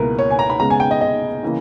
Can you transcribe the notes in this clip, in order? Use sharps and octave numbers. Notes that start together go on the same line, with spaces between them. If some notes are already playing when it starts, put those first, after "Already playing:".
Already playing: C#2 B2 A#3 E4 A#4 B4
C#5
G#5
A#5
B5
C#3 G#3 B3 A#5
G#5
G5
D#5
D#5
C#3 E3 A#3